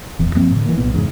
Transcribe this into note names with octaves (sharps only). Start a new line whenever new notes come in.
D#1 E2
F#2 F3 A#3 C4
A2 D3
E3 A#3
B1 A#2 B3
E2 G#2 C#3